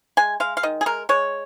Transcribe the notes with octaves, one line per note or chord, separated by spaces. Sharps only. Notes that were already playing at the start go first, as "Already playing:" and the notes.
G#3 G#5
G#3 F5
F5
D#3 D#5
G#4
G#3 A#4
G#3 C#5